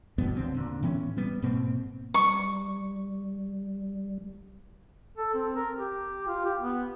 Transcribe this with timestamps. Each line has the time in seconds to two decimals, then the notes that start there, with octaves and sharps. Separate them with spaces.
0.18 E2 G2 B2 B3
0.37 D#2 D3 C4
0.54 A#2 D3
0.83 A2 E3 B3 C#4
1.17 G3 B3
1.42 G#2 B2 A#3 C4
2.14 G3 C#6
5.17 A4
5.34 C4
5.56 A#4
5.77 G4
6.28 F4
6.45 G4
6.59 B3